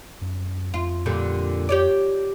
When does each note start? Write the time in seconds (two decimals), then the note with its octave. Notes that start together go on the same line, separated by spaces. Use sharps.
0.22 F#2
0.74 F2 F4
1.06 A#2 D3 G3
1.69 G4 C#5 D5